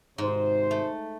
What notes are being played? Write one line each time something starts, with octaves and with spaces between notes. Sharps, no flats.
G#1 G#2 C3 C5
A3